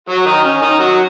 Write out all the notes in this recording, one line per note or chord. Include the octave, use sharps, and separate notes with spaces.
F#3 F#4
D#3 D#4
C#4
D#3 D#4
F#3 F#4